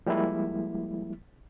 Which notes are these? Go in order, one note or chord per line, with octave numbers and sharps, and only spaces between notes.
F3 G3 G#3 A#3 E4